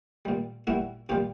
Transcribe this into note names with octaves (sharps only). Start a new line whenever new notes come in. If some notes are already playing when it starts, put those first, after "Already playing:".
A#2 G3
A#2 G3 E4 F#4
A#2 G3 F4 G4